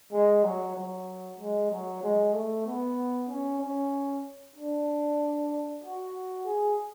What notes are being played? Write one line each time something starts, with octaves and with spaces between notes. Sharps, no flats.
G#3
F#3
F#3
G#3
F#3
G#3
A3
B3
C#4
C#4
D4
F#4
G#4